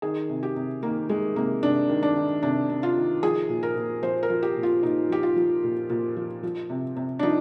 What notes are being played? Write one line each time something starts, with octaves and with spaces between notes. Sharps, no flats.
D#3 G#4
C3
G4
C3
D#3 A#3
D#3 G#3
C3 A#3
C3 D4
D#3
D4
D#3
C3 D4
C3
F4
D#3
F3 G#4
A#2
A#4
A#2
F3 C5
A#4
F3
G4
A#2
F4
A#2 D#4
F3 G4
F4
F3
A#2
A#2
F3
F3
C3
C3
D4
F3 D#4